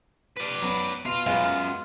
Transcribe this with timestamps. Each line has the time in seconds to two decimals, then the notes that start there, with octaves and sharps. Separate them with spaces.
0.37 B4 D5
0.62 F#3 B3
1.05 B2 F4
1.26 F#2 G#3 B3 F4